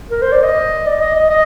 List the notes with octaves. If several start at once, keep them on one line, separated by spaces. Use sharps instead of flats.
A#4
C5
D5
D#5
D5
D#5
D#5
D#5